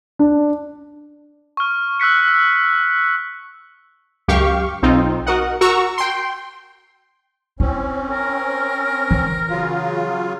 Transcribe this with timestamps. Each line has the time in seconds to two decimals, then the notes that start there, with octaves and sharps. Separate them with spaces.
0.19 D4
1.57 C#6 F6
2.00 E6 F#6 B6 C#7
4.28 C#2 F#2 G4 F5 C#6
4.82 B1 C4 D#4 F4
5.27 F#4 A#4 D#5 F#5
5.61 F#4 A#4 A#5 C#6 E6
5.98 G5 C6
7.60 C4 C#4 E4
8.11 A#4
9.11 E3
9.49 C#3 F#3 F4